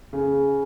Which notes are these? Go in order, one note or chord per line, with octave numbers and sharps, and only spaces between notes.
C#3